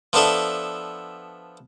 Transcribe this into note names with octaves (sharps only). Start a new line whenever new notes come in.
F3 B3 D4 A4 E5